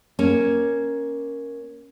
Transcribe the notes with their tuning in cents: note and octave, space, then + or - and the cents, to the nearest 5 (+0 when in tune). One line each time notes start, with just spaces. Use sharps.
A#3 +10 C#4 +0